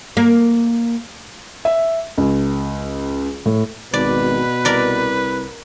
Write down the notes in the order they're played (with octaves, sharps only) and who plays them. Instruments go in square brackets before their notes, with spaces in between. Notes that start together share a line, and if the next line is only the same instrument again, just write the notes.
[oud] A#3
[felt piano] E5
C#2
A2
[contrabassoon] G#1 [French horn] B2 [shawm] B4 [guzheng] D5
[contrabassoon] C2 [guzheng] A#4 D5 B5